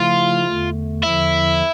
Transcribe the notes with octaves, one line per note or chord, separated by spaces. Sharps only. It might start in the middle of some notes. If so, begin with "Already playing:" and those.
Already playing: C#3 F3 A3 E4 F4
E2 D3 A3
E2 D3 F3 E4